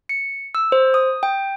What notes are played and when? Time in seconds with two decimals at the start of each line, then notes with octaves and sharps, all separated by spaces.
0.09 C#7
0.55 E6
0.72 C5
0.94 D#6
1.23 G5